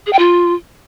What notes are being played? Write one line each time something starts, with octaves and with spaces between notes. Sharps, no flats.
G#4
G5
F4